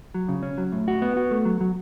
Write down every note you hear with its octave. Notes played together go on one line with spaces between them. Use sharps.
F#3
C#3
C#4
F#3
A2
F#4
B3
F#4
A3
F#3
F#3